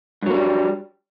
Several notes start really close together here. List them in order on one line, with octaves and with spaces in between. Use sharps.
G2 F#3 A#3 G3